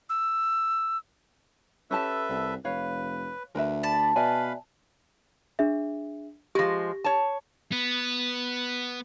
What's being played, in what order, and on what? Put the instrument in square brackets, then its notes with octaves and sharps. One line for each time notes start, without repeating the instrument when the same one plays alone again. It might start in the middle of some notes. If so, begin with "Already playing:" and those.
[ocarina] E6
[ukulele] C#4 G4 A5 [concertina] A4 B4 E5
[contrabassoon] C2
[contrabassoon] F1 [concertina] B4 [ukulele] C#5 F5
[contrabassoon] D2 [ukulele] A#4 B4 E5
[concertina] D5 B5 [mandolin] A5
[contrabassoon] B2 [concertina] B4 F5 B5 [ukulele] D5 E5 G#5
[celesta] D4 G#4 E5
[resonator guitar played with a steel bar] F3 G#3 [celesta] G4 A#6
[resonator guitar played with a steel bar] C#5 A5
[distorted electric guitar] B3